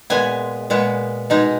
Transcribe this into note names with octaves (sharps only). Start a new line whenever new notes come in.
A#2 G#3 B3 G#5
A#2 G#3 B3
B2 G#3 D#4